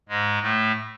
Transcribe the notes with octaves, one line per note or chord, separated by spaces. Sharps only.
G#2 G#3
A2 A3